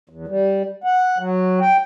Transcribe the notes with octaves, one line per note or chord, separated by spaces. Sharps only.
E2
G3
F#5
F#3
G5